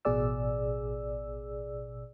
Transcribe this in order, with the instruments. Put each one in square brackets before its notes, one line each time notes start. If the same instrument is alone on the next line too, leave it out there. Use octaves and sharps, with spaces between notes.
[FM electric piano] A1 B2 G#4 D5 E6